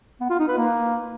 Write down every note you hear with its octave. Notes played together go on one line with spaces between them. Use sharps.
B3
F4
D#4
B4
A#3